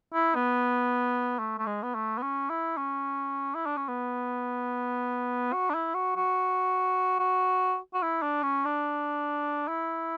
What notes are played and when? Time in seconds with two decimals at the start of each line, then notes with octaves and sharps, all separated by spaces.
0.14 E4
0.35 B3
1.39 A3
1.59 A3
1.66 G#3
1.83 B3
1.95 A3
2.18 B3
2.22 C#4
2.50 E4
2.78 C#4
3.55 E4
3.66 D4
3.77 C#4
3.88 B3
5.53 F#4
5.70 D4
5.74 E4
5.94 F#4
6.16 F#4
7.19 F#4
7.94 F#4
8.02 E4
8.22 D4
8.43 C#4
8.65 D4
9.68 E4